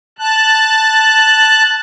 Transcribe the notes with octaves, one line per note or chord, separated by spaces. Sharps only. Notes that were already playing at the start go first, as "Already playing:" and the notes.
A5 F#6